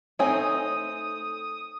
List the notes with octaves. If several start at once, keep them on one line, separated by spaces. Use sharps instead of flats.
A3 C4 D#4 C#5 G#5 D#6